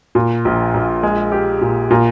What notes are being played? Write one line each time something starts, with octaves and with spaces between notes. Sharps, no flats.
A#2
A#1
A#1
G#3
G4
A#2
A#2